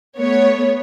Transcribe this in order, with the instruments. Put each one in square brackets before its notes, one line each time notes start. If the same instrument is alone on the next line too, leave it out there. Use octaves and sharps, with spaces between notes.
[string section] A3 B3 C#5